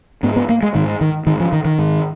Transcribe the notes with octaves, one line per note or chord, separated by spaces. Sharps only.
G#2 B3
B3
A#3
G#3
G#2 D#3
D#3
G#2 D#3
F3
D#3
D#3
G#2